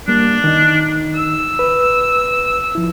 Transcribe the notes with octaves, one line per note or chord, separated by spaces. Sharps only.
G3 A#3 D4
D#3 D#4
E6
B4
F3 E4